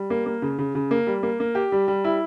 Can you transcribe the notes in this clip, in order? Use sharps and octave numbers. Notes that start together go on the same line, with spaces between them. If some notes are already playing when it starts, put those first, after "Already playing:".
Already playing: G3
A#3
A#3
C#3
C#3
C#3
A#3
G3
A#3
A#3
G4
G3
G3
E4